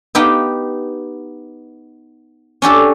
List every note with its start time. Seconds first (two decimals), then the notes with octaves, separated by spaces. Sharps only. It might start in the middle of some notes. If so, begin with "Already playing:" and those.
0.15 B3 D#4 G4 F5 G5
2.62 C#4 D4 G4 A4